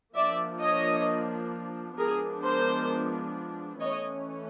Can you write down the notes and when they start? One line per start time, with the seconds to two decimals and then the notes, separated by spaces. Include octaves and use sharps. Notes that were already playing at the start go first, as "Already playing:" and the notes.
0.15 F3 A#3 D4 D5 E5
0.61 C#5 D#5
1.98 F3 G#3 B3 D4 G#4 A#4
2.43 A#4 C5
3.81 E3 A3 C#4 C#5 D#5